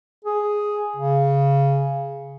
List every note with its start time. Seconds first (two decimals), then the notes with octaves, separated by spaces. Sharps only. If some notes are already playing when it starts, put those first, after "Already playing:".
0.24 G#4
0.96 C#3